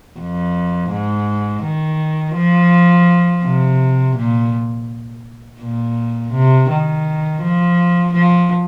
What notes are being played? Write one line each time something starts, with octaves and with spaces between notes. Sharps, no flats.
F2
G#2
D#3
F3
C3
A#2
A#2
C3
D#3
F3
F3